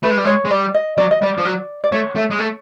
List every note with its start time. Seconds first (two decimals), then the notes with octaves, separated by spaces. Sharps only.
0.03 A3 B4
0.10 G#3
0.17 G3
0.24 G#3 C#5
0.45 G#3
0.51 G3 D5
0.74 D#5
0.98 F#3 D5
1.11 D#5
1.22 G3 D5
1.38 F3
1.45 F#3
1.84 D5
1.92 A3 C#5
2.16 A3
2.31 G#3
2.40 A3